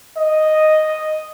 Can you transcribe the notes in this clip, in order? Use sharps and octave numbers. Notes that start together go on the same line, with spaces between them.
D#5